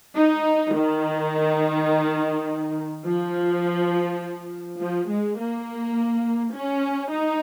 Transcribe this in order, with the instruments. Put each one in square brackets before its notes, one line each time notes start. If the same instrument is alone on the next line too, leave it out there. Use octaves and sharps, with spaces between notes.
[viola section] D#4
D#3
F3
F3
G#3
A#3
C#4
D#4